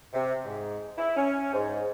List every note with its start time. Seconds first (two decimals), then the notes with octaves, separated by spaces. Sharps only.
0.13 C3
0.44 G#2
0.98 E4
1.16 C#4
1.53 G#2